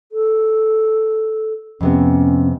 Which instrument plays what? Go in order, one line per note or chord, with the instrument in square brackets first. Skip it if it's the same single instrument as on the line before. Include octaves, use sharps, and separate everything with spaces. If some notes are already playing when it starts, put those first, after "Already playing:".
[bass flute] A4
[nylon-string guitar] F2 C3 B3 [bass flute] C#4